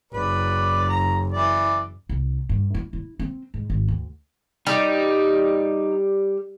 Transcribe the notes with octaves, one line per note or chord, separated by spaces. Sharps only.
F#1 B4 D5
A#5
E3 D5
C2
G2
E4
E4
C4
G#2
G#1
D2
G3 D#4